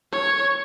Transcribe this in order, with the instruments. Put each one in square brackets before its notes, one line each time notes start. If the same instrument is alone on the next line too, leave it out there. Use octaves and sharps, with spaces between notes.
[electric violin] C#5